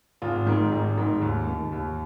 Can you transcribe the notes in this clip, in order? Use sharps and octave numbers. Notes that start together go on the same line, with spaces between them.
G#1 F4
G#2 D#3
G#1
G#2 D#3
D#2
D#3
D#2